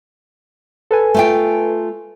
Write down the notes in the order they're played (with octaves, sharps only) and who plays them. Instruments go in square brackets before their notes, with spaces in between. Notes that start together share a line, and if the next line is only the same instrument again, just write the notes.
[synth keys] A4 B4 G#5
[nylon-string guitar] A3 F4 G5